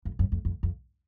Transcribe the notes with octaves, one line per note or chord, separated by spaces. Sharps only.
F2
F#2
F2
F2
F2